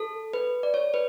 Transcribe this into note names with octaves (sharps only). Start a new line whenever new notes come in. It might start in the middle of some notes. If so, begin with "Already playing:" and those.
Already playing: A4
B4
D5
C#5
B4